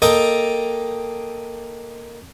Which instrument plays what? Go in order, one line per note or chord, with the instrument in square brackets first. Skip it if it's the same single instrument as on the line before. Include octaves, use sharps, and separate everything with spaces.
[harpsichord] A#3 A4 D#5 G5 A#5 D#6